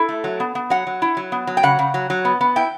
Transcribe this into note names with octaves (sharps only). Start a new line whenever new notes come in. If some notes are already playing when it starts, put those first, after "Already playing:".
Already playing: E4 A4
A3
F#3
B3
B3
F#3 F#5
F#3
E4
F#3
B3
F#3
G5
C#3 F#5
C#3
F#3
F#3
B3
B3
E4 G5